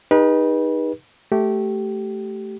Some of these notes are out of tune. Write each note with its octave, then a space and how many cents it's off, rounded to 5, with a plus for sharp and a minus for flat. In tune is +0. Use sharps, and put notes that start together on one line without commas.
D#4 +0 G4 +45 B4 -30
A3 -10 G4 -20